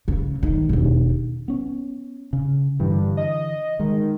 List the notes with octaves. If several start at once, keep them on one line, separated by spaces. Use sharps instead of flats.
C#3
D#3
E1 D#2
B3 C#4
C#3
G2 D3 E3
D#5
D#3 G#3